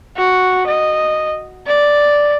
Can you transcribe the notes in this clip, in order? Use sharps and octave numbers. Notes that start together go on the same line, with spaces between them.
F#4
D#5
D5